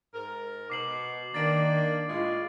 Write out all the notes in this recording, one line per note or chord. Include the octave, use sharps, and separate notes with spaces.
G#2 A#4
B2 D6 C7 F#7
D#3 A#3 D4 A6 D7
A2 G#3 F4